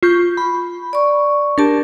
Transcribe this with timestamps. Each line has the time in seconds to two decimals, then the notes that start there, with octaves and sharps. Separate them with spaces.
0.03 F4 C#6 G6
0.37 B5
0.93 D5 C#6
1.58 D4 G4 A#4 A5